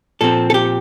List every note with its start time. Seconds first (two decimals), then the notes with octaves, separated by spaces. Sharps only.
0.21 A#2 F3 C4 A4
0.50 A4
0.54 G4